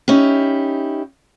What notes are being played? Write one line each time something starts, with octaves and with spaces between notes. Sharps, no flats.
C#4 D#4 E4 G4